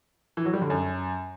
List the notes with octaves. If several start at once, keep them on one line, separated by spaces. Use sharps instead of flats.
E3
F#3
G3
D3
F#2